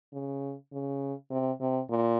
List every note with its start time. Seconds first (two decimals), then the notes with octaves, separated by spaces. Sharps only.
0.13 C#3
0.72 C#3
1.31 C3
1.60 C3
1.90 A#2